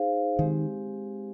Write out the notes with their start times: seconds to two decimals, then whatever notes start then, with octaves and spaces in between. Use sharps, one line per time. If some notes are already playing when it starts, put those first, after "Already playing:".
Already playing: D#4 G#4 C5 F5
0.39 D#3 G#3 C4 G4